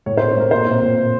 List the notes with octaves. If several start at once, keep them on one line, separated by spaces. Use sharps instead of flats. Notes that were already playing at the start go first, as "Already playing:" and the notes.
A2 C#5
C5
C4
C#5
A2 A#4
A#2 C5
C4
A#2